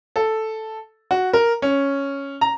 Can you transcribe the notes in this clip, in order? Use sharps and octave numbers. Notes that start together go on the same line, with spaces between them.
A4
F#4
A#4
C#4
A#5